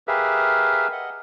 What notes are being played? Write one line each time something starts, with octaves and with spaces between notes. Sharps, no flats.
G4 G#4 A#4 B4 E5 F5
D#5 F#5